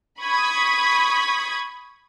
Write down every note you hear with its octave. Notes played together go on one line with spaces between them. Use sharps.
B5 C#6 D#6 G#6 B6